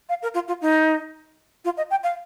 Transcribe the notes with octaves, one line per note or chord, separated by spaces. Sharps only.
F5
A#4
F4
F4
D#4
F4
D#5
G5
F5